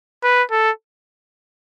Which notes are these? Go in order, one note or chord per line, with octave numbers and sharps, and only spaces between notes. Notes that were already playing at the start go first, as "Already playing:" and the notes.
B4
A4